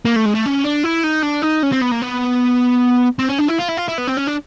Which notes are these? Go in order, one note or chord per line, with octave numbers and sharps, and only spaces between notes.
A#3
A3
G#3
A3
C#4
D4
E4
D#4
D4
D#4
C#4
C4
B3
A#3
B3
C4
C#4
D4
E4
F4
E4
F4
E4
B3
C4
C#4
D4